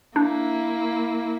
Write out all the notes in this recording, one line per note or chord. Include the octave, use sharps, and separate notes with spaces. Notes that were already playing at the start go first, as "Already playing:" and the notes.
A#3 D4 E4